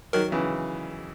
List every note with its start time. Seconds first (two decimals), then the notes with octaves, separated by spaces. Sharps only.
0.13 D#3 F#3 A#4
0.32 C#3 E3